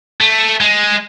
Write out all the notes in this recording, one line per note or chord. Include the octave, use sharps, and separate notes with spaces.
A3
G#3